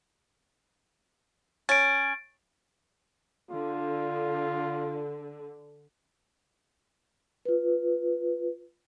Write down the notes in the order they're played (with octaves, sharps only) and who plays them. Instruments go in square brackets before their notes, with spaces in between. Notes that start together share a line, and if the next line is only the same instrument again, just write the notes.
[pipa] C#4 [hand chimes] A6 D7
[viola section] D3 [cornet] F4
[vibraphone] F4 B4